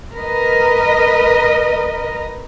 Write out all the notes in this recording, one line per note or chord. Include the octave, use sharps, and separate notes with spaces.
A#4 B4 D#5